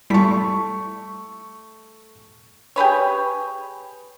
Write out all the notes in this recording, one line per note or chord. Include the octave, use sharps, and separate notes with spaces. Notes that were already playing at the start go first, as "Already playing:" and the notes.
G3 A3 E4 C#6 B6
G4 G#4 B4 C#5